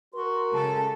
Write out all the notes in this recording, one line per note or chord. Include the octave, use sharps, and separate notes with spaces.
F#4 A#4 C6
C#3 G#3 A4 A5